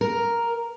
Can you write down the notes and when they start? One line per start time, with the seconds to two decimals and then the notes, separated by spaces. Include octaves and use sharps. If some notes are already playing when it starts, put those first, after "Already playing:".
0.01 A#4